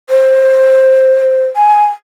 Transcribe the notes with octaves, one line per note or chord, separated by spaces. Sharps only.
C5
G#5